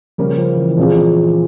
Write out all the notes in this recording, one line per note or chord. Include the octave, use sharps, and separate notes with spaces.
C#3 F3 G3 A#3 C#4
F3
E3
E3
A#2 F3 G#3 C4 F4 G#4